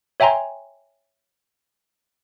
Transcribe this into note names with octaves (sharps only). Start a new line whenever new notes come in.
C#5 E5 G5 G#5 A#5 C6